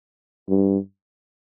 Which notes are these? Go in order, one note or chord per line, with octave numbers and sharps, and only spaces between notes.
G2